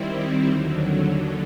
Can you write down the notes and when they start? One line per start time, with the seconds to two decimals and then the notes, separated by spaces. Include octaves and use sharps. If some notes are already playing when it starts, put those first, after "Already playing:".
Already playing: D#3 G3 C4 E4
0.43 D#2 D3 F#3